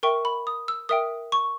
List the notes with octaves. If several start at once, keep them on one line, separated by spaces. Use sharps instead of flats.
A#4 E5 G5 C#6
B5
D#6
E6
A#4 E5 G5 D#6
C#6